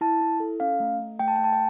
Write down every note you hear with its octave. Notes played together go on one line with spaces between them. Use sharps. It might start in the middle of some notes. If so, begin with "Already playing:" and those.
E4 A5
E4
A4
C#4 F5
A3
A3
A3 G5
A5
A3 G5
A5
G5